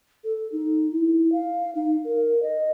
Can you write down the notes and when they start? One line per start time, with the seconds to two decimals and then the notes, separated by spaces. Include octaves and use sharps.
0.24 A4
0.52 D#4
0.91 E4
1.32 F5
1.75 D#4
2.04 A#4
2.43 D#5